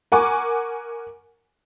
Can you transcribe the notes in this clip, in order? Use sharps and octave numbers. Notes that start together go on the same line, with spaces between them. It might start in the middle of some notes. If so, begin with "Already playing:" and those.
A#4 F#5 G#5 C#6 D6